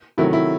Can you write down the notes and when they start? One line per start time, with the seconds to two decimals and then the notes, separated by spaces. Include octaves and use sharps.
0.18 C3 D#3 F#3 A3 E4
0.33 E4